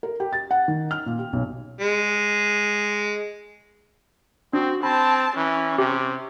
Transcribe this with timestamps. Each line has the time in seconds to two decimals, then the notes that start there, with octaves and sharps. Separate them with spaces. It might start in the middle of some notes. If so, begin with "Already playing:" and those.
0.03 A#4
0.20 G4
0.33 A6
0.51 F#5
0.68 D#3
0.91 F6
1.06 A#2
1.19 G4
1.33 B1
1.81 G#3
4.53 C4 D4 F#4
4.83 C4 A5 B5
5.36 E3 C#4
5.78 C3 G4